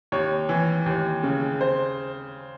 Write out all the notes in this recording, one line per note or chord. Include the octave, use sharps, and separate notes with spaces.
D#2 C#5
E3
D#2
C#3
C5